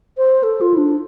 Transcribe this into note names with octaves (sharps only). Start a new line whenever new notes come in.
C5
A4
F4
E4
D4